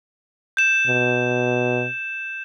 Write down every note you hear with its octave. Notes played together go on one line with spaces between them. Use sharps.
G6 E7
B2